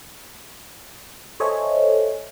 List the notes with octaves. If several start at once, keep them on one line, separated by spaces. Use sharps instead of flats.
A4 C5 C#5 D#5 E5 G#5